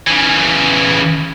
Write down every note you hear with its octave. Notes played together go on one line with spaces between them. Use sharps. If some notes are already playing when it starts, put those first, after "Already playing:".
C#3 E3